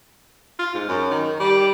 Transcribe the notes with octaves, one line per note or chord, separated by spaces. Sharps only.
F4
G#2
F#2
D#3
G3